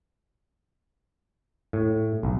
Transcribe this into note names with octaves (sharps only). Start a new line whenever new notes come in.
A2
B1